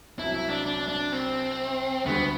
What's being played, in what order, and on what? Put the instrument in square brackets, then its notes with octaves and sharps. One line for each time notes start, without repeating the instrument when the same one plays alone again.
[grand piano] C2 C3 F#3 [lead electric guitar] E4
[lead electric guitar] E4
D4
D4
D4
C4
[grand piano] D2 D3 G3 [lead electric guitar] B3